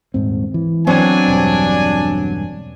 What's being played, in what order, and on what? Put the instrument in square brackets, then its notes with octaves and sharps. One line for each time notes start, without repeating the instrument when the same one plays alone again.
[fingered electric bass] D#1 G#2 C4
E3
[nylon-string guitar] F#3 C4 [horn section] D4 G#5
[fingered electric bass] E1 G2